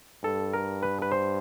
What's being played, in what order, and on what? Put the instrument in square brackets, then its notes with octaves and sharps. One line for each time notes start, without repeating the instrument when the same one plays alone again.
[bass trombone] G2 [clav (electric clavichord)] A4
[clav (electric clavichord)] A#4
B4
B4
C5